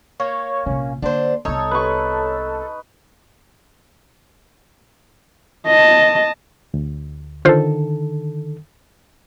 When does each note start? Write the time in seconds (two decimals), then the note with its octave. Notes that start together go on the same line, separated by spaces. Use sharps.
0.20 A#3 C#5
0.66 A#1 C3 C#4
1.02 D3 A#3 D4 C5
1.45 C2 B3 D#4 A4 C#5
1.71 B4 C#6
5.67 D#5 A5
6.74 D2
7.45 D3 D#3 F4 A4 C5